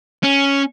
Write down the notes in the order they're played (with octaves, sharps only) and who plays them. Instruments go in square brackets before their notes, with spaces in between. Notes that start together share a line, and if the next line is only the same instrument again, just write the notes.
[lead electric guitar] C#4